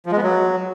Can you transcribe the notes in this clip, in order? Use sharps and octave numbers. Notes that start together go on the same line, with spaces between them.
F3
G#3
B3
F#3